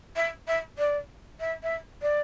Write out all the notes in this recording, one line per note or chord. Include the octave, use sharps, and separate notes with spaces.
E5
E5
D5
E5
E5
D5